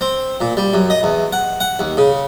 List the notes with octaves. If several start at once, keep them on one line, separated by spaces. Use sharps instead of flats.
C4
A#2
G3
F#2
D#5
E2
F#5
F#5
D#2
C#3